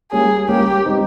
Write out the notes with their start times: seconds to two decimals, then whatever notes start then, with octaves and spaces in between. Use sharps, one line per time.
0.12 G3 A#3 C#4 G#4
0.48 G3 A#3 C#4 G4
0.86 G3 C4 D#4